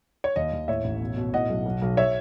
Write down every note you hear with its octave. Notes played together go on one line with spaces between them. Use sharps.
C#5
D#2 D#5
D#2
A2 C#5 E5
A1
B2
B2
A2 D#5 F#5
B1
B1
B1
C#5 E5